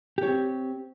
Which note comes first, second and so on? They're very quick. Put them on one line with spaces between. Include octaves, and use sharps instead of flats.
G4 C#5 C4